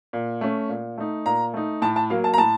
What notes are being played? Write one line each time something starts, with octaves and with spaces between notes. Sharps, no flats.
A#2
A3 C#4
A#2
A3 D#4
A#2 A#5
A3 D#4
A2 A5
A5
F#3 A#3 F5
A5
A#5
A2 A5